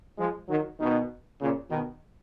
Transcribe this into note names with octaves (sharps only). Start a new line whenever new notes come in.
F3 G#3
D#3 F#3
B2 D#3
A#2 C#3
B2 D#3